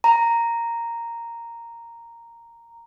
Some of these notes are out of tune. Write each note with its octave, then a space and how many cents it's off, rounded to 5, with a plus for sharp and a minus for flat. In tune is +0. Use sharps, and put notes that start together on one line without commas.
A#5 -5